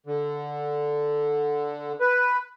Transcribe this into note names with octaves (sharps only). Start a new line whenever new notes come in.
D3
B4